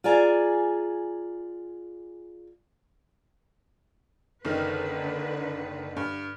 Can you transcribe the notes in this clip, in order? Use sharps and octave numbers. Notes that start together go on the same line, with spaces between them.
F4 G#4 D5 G#5 A#5
F#1 D3 D#3 B4 F6
G2